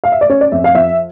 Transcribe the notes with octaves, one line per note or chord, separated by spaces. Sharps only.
F5
E5
D5
C#4 C#5
D5
F2 E5
F5
F3 E5